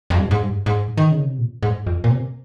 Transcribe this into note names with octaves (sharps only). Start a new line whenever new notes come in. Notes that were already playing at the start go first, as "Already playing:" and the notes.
F2
G2
G#2
G2
G#2
D#3
C#3
C3
A#2
G#2
F2
A#2
C3